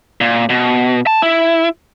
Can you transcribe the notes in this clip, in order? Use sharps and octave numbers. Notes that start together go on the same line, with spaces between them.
A#2
B2
A5
E4